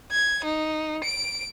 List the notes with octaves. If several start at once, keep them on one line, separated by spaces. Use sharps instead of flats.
G#6
D#4
D7